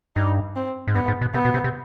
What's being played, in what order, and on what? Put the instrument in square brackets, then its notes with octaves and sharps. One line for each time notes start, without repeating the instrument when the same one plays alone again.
[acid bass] G2 [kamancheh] D#4
[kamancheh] C4
[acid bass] G#2
[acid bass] G2 [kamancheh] B3
[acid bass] G#2
B2
[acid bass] C3 [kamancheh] B3
[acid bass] B2
C3
C3